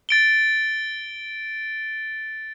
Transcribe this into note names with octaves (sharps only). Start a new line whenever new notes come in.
A6 D7 G7